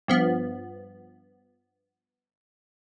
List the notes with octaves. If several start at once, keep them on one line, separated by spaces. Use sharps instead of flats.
G2 F3 B3